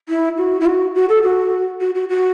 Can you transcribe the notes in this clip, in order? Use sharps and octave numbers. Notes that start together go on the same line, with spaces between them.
E4
F#4
E4
F#4
F#4
A4
F#4
F#4
F#4
F#4